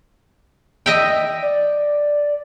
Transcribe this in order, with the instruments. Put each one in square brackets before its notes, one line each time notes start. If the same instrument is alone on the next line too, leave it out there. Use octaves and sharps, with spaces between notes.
[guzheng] D#5 E5 G5
[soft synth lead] D5